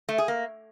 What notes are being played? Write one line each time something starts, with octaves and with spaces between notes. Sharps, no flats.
A3
G#4
A#3